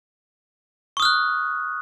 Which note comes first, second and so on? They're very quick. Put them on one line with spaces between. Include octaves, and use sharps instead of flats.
C#6 D#6 F6 F#6